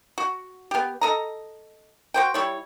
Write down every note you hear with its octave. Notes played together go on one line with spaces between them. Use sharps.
F#4
B3 G4
A4 D#5 A#5
F#4 C5 G5
G3 E4 C#5